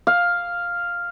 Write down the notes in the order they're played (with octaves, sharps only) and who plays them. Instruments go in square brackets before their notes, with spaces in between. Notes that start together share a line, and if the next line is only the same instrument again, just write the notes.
[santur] F5